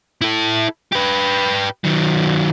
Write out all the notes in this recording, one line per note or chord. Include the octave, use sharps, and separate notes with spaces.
E4 A4
G4 B4
D#3 F#3